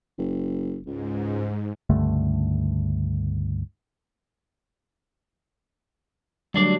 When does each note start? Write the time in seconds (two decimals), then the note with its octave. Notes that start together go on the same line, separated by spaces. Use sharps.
0.18 F#1
0.86 C#2 G#2
1.90 C#2 G2 D3 A3
6.54 D2 F#3 G3 D4 D5